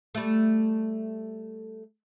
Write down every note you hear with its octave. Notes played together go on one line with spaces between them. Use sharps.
G3 A3